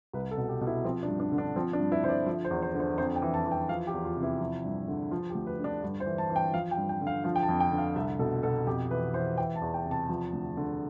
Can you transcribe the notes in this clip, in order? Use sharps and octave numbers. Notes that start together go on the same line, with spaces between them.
C2 B4
A4
B2
G4
B2
E4
F3 C4
D4
G2
D4
D3
D4
F3 C4
D4
G2
E4
D3 C5
D5
F3 E5
C5
E2
C5
D3
C5
F2 C5
G5
E3
A5
E3
G5
F3 F5
G4
E2
F4
C3
E4
F3
G2
D3
F3 F4
G4
D2
B4
D3 D4
G2
C5
E3
A5
E3
G5
F3 F5
G5
G2
G5
D3
F5
F3 F5
G5
A5
F2
G5
D3
F5
C2 E5
B2 A4
B2 A4
F2 G4
E3 B4
E3 C5
E3 G5
A5
E2
G5
C3
A5
F3
D2
D3